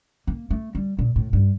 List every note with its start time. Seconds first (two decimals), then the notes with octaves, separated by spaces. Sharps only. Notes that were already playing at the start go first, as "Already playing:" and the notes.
0.27 A#3
0.51 A3
0.75 G3
0.99 A#2
1.16 A2
1.33 G2